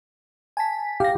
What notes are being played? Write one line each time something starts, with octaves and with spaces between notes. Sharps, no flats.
G#5 A5 B6
G4 F5 A#6